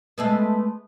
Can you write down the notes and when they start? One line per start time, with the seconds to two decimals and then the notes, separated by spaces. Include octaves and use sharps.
0.18 G#3 A3 B3